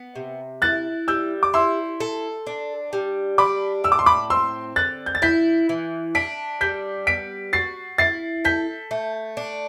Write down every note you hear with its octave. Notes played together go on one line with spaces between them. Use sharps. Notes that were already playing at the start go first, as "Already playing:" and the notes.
Already playing: B3
C3
E4 F#6 A6
G3 E6 G6
D6
E4 C6 E6
A4
D4
G3
D4 B5 D6
A2 E6
D6
C6
B5 D6
C4 C6 E6
D3 F#6 A6
G6
A6
E4 G6 B6
E3
D4 B6 D7
G3 G6 B6
B3 B6 D7
F#4 A6 C7
E4 A6 C7
A4 G6 B6
A3
D4